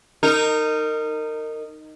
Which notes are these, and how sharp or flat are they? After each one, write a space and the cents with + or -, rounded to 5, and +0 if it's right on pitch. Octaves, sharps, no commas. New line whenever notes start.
D#4 -10 A#4 -25